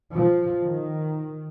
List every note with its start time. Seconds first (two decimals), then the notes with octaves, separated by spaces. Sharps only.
0.12 F3
0.65 D#3